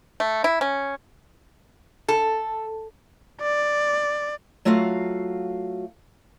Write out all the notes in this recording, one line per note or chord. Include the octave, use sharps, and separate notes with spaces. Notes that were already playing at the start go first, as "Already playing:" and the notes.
A3
E4
C#4
A4
D5
F#3 A3 F4 F#4 F5